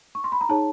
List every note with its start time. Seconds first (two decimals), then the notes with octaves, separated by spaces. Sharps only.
0.15 C#6
0.24 C6
0.32 B5
0.41 A#5
0.49 D#4 G#4 C#5 A5